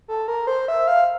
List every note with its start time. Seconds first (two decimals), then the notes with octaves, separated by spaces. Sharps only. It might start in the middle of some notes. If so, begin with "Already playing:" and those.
0.08 A4
0.28 A#4
0.47 C5
0.68 E5
0.87 F5